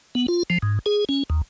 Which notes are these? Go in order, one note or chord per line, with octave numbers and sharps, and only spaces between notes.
B3
F4
F3
G#2
G#4
C#4
D#2